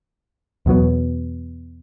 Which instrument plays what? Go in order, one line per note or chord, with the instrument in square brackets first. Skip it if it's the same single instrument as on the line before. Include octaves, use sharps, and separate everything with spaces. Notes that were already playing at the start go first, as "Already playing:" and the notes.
[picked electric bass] E2 B2 F#3 B3